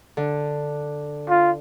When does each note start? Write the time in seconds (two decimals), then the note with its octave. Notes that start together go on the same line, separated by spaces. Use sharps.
0.17 D3
1.29 F4